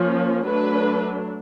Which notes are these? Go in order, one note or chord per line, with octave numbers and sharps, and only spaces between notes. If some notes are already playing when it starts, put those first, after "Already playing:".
Already playing: F3 A#3 C#4
F#3 A3 D4 B4